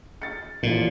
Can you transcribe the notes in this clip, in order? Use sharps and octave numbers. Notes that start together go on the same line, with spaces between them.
A6 C#7
A1 A#2 F3